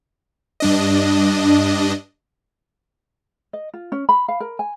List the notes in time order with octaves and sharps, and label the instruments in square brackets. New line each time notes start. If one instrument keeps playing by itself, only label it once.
[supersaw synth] G2 D4 D#5
[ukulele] D#5
F4
C#4
B5
F5
A#4
G#5